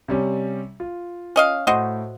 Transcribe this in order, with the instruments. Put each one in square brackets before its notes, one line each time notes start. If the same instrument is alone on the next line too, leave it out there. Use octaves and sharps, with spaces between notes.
[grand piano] C3 G3 C#4
F4
[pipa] C#4 D#5 F5
[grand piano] A2 [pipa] F#4 C5 D#5